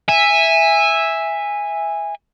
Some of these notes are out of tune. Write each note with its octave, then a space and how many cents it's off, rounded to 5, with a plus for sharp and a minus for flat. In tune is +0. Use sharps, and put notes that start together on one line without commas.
E5 +0 G#5 -15